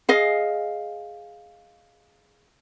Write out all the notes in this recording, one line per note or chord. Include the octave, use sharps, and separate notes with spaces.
G#4 D#5 F5